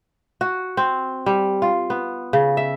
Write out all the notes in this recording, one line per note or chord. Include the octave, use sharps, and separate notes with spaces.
F#4
C4
G3
F4
B3
C#3
E5